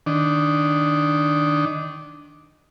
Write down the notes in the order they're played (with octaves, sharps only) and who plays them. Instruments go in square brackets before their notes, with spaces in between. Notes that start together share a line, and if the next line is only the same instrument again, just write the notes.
[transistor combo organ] D#3 D4